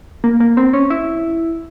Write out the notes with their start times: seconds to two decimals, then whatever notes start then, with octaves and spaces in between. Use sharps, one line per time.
0.24 A#3
0.40 A#3
0.57 C4
0.73 C#4
0.90 E4